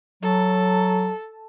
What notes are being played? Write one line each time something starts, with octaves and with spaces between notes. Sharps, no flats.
F#3 A4